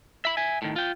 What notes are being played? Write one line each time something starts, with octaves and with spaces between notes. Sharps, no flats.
E5 B5
E5 G#5
A2 D#3
F4 G5